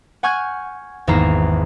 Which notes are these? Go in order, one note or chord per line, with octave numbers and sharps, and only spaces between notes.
F#5 G#5 C#6 F6 G6 G#6
G#1 E2 A#3 E5 A#5 C7